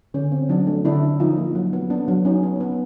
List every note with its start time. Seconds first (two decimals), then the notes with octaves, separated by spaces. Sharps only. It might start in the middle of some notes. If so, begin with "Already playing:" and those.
0.14 D3 C#4
0.32 C4
0.49 F#3 D4
0.67 A3
0.85 D3 D4 E4
1.02 C#4
1.20 F3 D#4 F4
1.38 A#3
1.55 F#3
1.73 B3
1.90 B3 D4
2.08 F#3
2.25 F#3 C#4 D#4
2.43 B3
2.60 B3